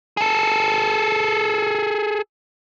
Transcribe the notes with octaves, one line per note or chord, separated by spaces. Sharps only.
G#4 A4